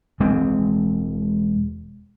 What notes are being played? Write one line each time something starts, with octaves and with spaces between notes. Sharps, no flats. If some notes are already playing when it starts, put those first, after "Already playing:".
E1 G#3 C4